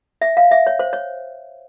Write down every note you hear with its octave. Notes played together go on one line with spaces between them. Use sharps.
E5
F5
E5
C#5
C5
C#5